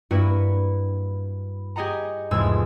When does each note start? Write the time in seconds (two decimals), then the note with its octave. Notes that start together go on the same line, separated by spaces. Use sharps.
0.11 G2 A#3 E4 F#4 B4
1.76 G4 G#4 D#5 F#5 A#5
2.31 F1 E2 G#2 G#3 E6 G#6